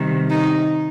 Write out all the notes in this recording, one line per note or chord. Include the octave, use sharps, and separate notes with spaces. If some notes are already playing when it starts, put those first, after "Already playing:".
Already playing: C3 D#3 G3
D#4